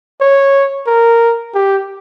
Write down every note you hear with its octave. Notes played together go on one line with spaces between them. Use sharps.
C#5
A#4
G4